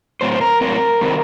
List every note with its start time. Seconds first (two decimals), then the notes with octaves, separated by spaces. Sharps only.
0.21 A2 F#3 C4 C5
0.41 A#4
0.61 A2 F#3 C4 A#4
1.01 D#3 G3 C4